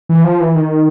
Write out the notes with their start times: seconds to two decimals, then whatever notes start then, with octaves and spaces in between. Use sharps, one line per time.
0.09 E3
0.24 F3
0.40 E3
0.55 D#3